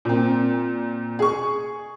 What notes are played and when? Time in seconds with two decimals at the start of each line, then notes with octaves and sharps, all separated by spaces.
0.05 A#2 C4
1.19 G#4 C#6